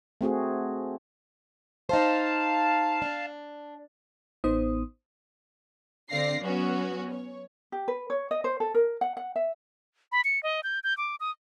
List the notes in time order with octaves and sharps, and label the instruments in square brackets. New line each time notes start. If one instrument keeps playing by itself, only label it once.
[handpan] A3 C4 F#4 G#4
[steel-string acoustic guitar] D#4 C5 [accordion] F5 A5
[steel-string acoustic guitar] D4
[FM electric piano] A1 B3 D#4 C5 D#6
[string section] D3 C4 D5 F5 A#6 C7
F#3 B3 C#4 F#4
C#5
[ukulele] G4
B4
C#5
D#5
C5
A4
A#4
F#5
F#5
E5
[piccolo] B5
C#7
D#5
G6
G6
D6
D#6